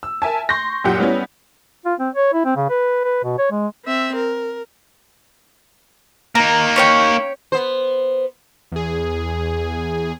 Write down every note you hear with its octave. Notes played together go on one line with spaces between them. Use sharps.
E6
A#4 E5 G#5 A5
C6 C#6 G6 A#6
F#2 A#2 G4 F#5 G6
G3 B3 C#4 E4
F4
C4
C#5
E4
C4
C#3
B4
B4
B2
C#5
G#3
C4 E5
A#4
A#3 D#4 A#5
C#4 C#5 G5
B3 C5
E2 G#4